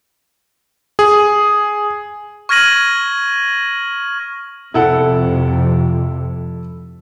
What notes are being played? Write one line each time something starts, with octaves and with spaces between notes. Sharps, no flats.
G#4
C#6 F6 G#6 A#6 D#7 F#7
F2 C3 E4 A4 F#5